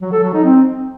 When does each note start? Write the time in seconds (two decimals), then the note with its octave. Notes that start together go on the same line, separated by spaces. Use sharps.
0.02 F#3
0.12 A4
0.23 F#3
0.33 D#4
0.44 C4